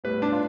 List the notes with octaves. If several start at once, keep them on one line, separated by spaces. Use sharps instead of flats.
A2 G3 B3 B4
D4
F4